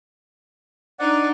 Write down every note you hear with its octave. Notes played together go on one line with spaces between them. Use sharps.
D4 D#4 D5 F#5